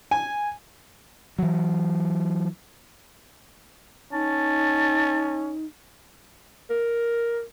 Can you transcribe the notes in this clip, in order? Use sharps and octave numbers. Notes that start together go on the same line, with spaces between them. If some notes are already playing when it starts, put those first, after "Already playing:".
G#5
E3 F#3
C#4 D#4 A5
A#4